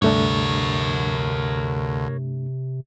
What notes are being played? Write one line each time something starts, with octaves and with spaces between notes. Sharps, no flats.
D2 G2 C3 A3 D4 A#4 C#5